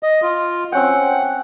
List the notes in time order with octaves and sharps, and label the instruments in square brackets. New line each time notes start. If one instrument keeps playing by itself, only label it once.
[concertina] D#5
F4
[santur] C4 C#4 G5 [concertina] F#5